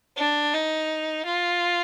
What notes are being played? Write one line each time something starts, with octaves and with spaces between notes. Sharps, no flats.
D4
D#4
F4